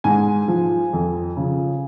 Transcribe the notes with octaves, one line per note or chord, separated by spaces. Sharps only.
G#2 G#5
F3
F2
C#3 F3